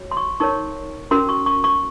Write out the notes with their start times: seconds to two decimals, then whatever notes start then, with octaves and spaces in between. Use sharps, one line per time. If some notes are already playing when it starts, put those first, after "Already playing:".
Already playing: F#4 C#5
0.11 C6
0.17 C#6
0.40 D#4 A#4 C#5 C#6
1.11 C#4 F#4 A#4 C6
1.29 C#6
1.46 C#6
1.64 C#6